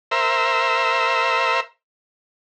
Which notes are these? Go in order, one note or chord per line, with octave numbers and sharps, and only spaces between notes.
A#4 C5 E5